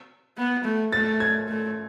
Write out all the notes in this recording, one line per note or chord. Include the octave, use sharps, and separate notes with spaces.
B3
A3
A3 A6
G#6
A3